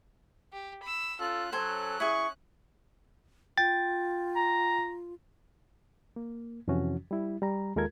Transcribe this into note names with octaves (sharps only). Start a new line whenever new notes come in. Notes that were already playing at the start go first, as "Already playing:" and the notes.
G4
B5 E6
C#4 F4 A4 F#6
F#3 A4 C5 G#5
E4 G#4 C#6
F4 G5 A6
A#5
A#3
F2 C3 E3 F3 C#4 F#4
G3 E4
G3 A#5
D#2 G#3 F4 A4 A#4 G#6